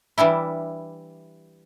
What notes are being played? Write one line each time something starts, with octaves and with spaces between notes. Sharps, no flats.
E3 G3 D4 E4